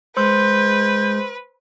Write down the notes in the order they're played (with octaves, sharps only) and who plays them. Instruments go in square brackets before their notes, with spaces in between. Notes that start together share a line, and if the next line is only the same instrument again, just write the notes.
[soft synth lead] G#3 [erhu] B4 [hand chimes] C5 C6 E6 [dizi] G6